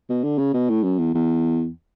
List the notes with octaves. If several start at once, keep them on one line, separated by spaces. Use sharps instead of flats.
B2
D3
C#3
B2
A2
F#2
E2
E2